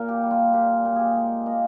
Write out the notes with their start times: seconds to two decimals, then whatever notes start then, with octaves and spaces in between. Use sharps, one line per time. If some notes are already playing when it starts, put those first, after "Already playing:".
Already playing: A#2 A#3 A#4
0.08 G4
0.23 G3
0.31 F4
0.53 A#2 G4
0.85 A#2
0.96 G4 G#4
1.16 G#3
1.46 A#3 D#5